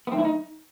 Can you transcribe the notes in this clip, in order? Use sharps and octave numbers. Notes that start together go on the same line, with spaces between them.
B3
F#2 D#3 A3 C4
E4
D#4